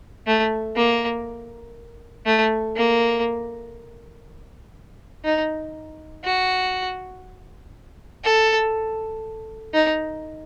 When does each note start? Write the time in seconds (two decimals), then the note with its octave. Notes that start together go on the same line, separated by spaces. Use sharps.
0.27 A3
0.76 A#3
2.26 A3
2.76 A#3
5.25 D#4
6.25 F#4
8.24 A4
9.74 D#4